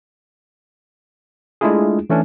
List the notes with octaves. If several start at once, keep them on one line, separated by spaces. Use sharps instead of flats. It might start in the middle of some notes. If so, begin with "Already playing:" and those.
G#3 A3 D4 E4 F4 G#4
E3 A3 C#4 D4